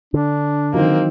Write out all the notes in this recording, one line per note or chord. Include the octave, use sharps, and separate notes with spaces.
D3 D4
D#3 E3 F#3 A#3 C4